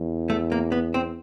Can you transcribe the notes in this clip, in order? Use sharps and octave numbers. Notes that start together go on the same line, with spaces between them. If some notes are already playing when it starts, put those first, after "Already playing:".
Already playing: E2
A3
A#3
B3
C4